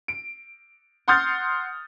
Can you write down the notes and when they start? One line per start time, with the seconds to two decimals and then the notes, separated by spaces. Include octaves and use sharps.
0.08 D7
1.08 F#5 C6 D#6 F6 G6 A6